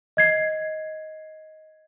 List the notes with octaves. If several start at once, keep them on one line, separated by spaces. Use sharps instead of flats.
D#5 G#6 C7